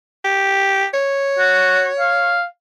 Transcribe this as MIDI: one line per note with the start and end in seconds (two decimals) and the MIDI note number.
0.25 0.86 67
0.94 2.37 73
1.39 1.87 66
1.99 2.44 77